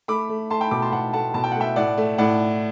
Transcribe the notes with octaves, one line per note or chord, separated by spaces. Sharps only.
A3 B5 D6
A3
A3 A5 C6
G5 B5
B2 B5 D6
A5 C6
B2 F#5 A5
A3 F#5 A5
B2 A5
G5
F#5
A3 E5 G5
A2 D5 F#5
A3
A2 D5 F#5